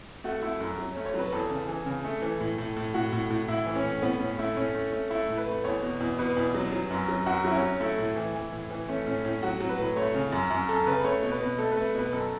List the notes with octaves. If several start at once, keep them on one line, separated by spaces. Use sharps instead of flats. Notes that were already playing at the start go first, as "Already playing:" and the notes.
A3 F#4
A3 E4
F#2
F#3
A3 C#4
C#5
F#3 B4
E2 A4
C#3
E3
C#3
A3
E3
A2
A2
A2
A2 F#4
A2
A2
A2 E4
E3
C#4
A2
A2 B3
A2 C#4
A3 E4
A2 C#4
A3
A3
A3 E4
A2
B4
A3
E2 C#5
B2
E2
B2 B4
E2
F#3
F#3
F#2
F#3
F#2 F#4
F#3 E4
C#4
F#3
A3 E4
A2
E3
E3
A2
E3
A3 C#4
A2 C#4
A2 C#4
F#3 F#4
F#3
B4
A2
A3 C#5
C#3
F#2
F#2
F#2 A4
C#3 B4
A3 C#5
B2
B4
B2
A3 A4
B4
A3
B2 B4
F#2 A4